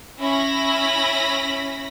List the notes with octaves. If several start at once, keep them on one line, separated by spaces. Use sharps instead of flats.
C#4 E4 B5 A#6